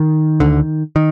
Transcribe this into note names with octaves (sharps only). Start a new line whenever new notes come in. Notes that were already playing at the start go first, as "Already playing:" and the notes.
Already playing: D#3
D2 D3
D#3